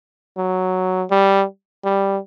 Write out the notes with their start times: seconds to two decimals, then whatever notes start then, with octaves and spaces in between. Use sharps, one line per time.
0.37 F#3
1.10 G3
1.84 G3